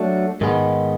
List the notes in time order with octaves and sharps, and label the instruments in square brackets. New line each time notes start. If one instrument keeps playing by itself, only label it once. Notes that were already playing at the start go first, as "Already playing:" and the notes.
Already playing: [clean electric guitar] F#3 A3 D4 F#4
G#2 D#3 G#3 B3